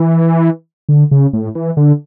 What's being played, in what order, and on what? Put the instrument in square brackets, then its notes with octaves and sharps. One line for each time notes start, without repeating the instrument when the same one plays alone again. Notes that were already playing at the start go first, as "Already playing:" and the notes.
Already playing: [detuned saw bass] E3
D3
C#3
A2
E3
D3